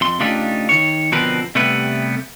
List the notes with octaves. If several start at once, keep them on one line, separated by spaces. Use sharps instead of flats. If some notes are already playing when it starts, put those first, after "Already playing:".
F2 C6
C#3 A3 D4 D#4 F4 G4
D#3 C#5
B2 D3 F3 C4 A#4 B4
C3 G3 A3 B3 B4